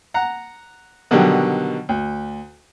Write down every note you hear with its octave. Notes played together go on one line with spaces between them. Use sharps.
F#5 A#5
B2 D3 D#3 F#3 G3
D2